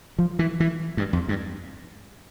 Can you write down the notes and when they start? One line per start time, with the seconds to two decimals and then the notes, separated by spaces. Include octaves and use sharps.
0.19 F3
0.39 E3
0.60 E3
0.97 G2
1.13 F2
1.28 G2